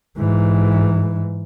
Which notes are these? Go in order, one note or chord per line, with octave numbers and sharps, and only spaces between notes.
G#2 E3